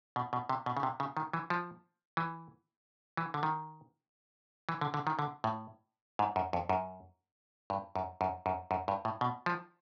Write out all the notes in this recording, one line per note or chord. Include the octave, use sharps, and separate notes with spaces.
B2
B2
C3
B2
C#3
C3
C#3
D#3
E3
F3
E3
E3
D3
D#3
E3
D3
D3
D#3
D3
A2
G#2
F#2
F2
F#2
G2
F#2
F#2
F#2
F#2
G2
A2
B2
F3